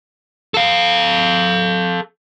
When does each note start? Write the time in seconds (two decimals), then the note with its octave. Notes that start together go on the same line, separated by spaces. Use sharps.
0.54 A4 F5